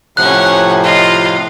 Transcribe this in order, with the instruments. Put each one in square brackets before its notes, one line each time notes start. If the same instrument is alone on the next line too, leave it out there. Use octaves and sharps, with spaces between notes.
[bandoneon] A2 C3 F3 [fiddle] C#4 F#5 [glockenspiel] F#6
[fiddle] F4 D#5